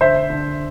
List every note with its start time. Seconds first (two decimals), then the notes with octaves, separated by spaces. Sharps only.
0.01 D3 C5 E5
0.30 D3